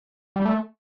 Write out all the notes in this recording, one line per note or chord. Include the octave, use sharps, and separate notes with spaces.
G3
A3